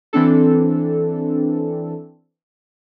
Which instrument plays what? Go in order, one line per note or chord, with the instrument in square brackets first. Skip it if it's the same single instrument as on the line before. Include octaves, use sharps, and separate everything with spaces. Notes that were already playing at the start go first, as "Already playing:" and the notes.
[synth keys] E3 C4 D4 A4